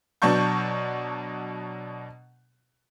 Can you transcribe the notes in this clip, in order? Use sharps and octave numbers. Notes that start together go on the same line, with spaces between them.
B2 F#3 D4 A5 C#6 G6